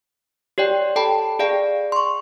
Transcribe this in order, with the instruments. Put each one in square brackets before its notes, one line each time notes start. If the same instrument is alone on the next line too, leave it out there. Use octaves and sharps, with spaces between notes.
[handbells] G4 C#5 D5 G5
A4 G5 A5 B5
G#4 D5 F5 G5
C6 C#6